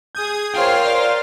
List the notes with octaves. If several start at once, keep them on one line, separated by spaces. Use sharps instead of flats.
G#4 D#6 G6 G#6
F4 A#4 C5 C#5 G5 C6 F6
D5